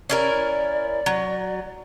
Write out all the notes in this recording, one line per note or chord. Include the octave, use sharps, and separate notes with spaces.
C#4 E4 A#4 D5
F#3